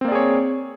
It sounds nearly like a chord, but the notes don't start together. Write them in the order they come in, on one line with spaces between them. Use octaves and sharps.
C4 A#3 D5 G#4 C#5